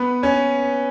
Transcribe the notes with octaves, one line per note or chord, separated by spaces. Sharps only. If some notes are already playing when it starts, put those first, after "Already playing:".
Already playing: B3 B4
C#4 C#5